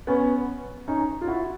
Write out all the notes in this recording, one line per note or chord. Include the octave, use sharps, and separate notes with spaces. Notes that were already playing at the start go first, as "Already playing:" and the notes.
B3 C#4
C#4 D#4
F4
E4 F#4